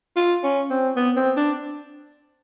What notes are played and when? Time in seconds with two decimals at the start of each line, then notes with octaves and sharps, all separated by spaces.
0.16 F4
0.44 C#4
0.70 C4
0.96 B3
1.17 C4
1.37 D4